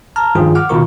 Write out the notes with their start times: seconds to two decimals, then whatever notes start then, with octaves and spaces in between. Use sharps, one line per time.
0.16 A5 A#5 F6
0.35 G2 D#3 F3 F4 G#4
0.55 F#5 D6 F6
0.69 B2 D#3 F4 A#4 C#6